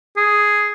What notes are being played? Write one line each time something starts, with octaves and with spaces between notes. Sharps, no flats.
G#4